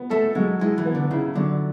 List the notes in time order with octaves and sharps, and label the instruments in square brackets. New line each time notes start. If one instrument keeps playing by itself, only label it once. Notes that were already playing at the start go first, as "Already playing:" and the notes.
Already playing: [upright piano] B3
[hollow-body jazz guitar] A3 [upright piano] A4
[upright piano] F#3 [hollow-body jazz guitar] G#3
[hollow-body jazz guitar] G#3 [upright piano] E4
[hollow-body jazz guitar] E3
[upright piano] B3
[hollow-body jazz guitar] D3
[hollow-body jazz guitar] C#3 [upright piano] E4
[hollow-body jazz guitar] D3 [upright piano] F#3